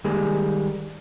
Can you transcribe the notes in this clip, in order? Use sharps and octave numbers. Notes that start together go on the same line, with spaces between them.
D#3 G3 G#3 A#3 G4 G#4